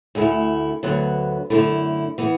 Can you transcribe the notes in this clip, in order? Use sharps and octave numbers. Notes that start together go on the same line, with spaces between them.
D2 D3 A3 E4
D2 D3 F#3 B3
F#2 D3 A3 E4
E3 B3